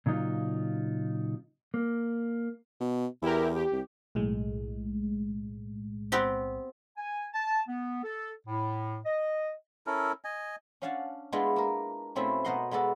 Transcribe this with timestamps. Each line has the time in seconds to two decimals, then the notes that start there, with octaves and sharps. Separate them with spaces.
0.06 A#2 C#3 F#3 D#4 F4
1.74 A#3
2.80 B2
3.22 E2 E4 G4 A#4
3.55 G4
3.72 C2
4.15 B1 A2 G#3
6.12 B3 C4 G4
6.97 G#5
7.34 A5
7.67 B3
8.04 A4
8.47 A2
9.05 D#5
9.87 C#4 E4 A4 A#4
10.24 D#5 G#5
10.82 C#4 D4 F5 F#5 G#5 A5
11.32 G#3 B3 D4 E4 F4
11.56 A#3 A#4
12.15 B2 A3 C4 C#4 E4 F4
12.45 B2 A#4 C5 D#5 F#5 C6
12.71 G#3 B3 F#4 A4 D5